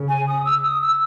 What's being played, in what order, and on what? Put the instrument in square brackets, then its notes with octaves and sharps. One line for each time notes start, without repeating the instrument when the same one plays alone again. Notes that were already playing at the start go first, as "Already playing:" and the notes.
Already playing: [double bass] C#3
[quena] G#5
D#6
E6
D#6
E6